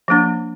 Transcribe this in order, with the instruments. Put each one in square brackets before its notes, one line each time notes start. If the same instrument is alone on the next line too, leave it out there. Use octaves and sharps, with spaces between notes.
[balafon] F3 A#3 D4